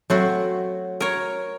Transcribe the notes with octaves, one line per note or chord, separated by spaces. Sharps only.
F#3 A3 C4 F#4
A#4 C#5